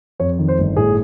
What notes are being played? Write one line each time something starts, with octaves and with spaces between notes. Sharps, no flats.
F2 C#5
D#3
C5
G1
A2 G#4